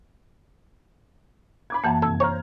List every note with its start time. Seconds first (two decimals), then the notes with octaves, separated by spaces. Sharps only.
1.70 B5 D6 G#6
1.84 F#2 E3 A#3 F#5 A5
2.02 F1 A4 G#6
2.20 C5 C#5 A#5 F6